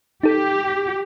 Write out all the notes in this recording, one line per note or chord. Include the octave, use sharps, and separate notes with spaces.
D#4 G4 A4